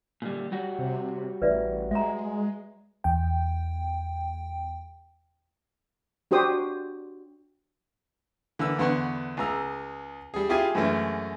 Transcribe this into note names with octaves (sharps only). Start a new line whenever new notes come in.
A#2 D3 G3
G3 F#4
C3
A1 B4 D5 E5
G#3 E5 A#5
E2 G5
D4 F#4 G4 C5 D#6
D3 E3 A#3 E6
E2 D3 B3 F#5 C6 C#6
C#2 G#4 A#5 E6
G3 G#4
E4 F4 G4 G#4 F5 G#5
F#2 E3 G#3 A3 C#4